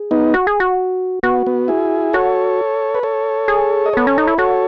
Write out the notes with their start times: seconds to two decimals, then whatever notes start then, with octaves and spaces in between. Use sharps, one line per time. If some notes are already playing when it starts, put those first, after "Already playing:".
Already playing: G#4
0.11 B3 D#4
0.34 F#4
0.47 G#4
0.60 F#4
1.23 B3 F#4
1.47 B3
1.68 E4 G#4
2.13 F#4 A4 C#5
2.95 B4
3.03 A4 C#5
3.48 G#4
3.86 D#5
3.93 B3 A4 C#5
4.07 C#4
4.18 D#4
4.27 E4
4.38 F#4 A4 C#5